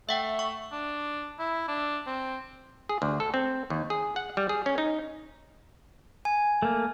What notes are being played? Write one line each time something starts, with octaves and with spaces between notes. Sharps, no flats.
A3 E5 F#5 G5
C#6
D4
E4
D4
C4
G#4
D2
A4
C4
D#2
G#4
F#5
G3
G#4
C#4
D#4
G#5
A3 A#3